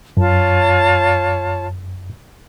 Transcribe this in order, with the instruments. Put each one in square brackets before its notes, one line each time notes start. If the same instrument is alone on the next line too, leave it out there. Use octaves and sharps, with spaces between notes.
[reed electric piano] F#2 [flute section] F4 C#5 A5